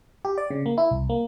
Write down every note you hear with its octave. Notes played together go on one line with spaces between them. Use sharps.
G4
D5
C#3
A#3
E4
C2
A#3